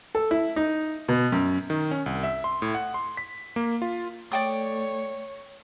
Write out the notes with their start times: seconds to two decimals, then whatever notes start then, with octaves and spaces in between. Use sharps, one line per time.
0.15 A4
0.31 E4
0.56 D#4
1.08 B2
1.32 F#2
1.70 D#3
1.91 C#4
2.06 C2
2.24 E5
2.44 C6
2.62 A2
2.75 F#5
2.94 C6
3.17 B6
3.56 A#3
3.82 F4
4.32 A3 C#5 D5 G5 D#6